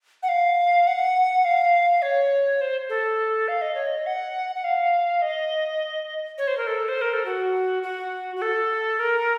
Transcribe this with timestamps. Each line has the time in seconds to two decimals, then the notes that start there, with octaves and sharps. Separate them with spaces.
0.23 F#5
0.29 F5
0.87 F#5
1.45 F5
2.02 C#5
2.61 C5
2.89 A4
3.48 F5
3.62 D#5
3.75 C#5
3.87 D#5
4.06 F#5
4.55 F#5
4.64 F5
5.22 D#5
6.38 C#5
6.47 C5
6.57 A#4
6.67 A4
6.88 C5
7.01 A#4
7.13 A4
7.25 F#4
7.83 F#4
8.36 F#4
8.42 A4
8.99 A#4